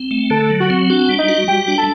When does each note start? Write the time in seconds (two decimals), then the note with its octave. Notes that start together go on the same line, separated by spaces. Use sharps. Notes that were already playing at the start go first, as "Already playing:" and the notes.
Already playing: C4
0.11 A3
0.30 D3 A4
0.50 F#3
0.60 F#4
0.70 C4
0.90 D4 F#4
1.09 G3
1.19 D#4
1.29 F#4
1.48 G3 G4
1.68 D4
1.78 A4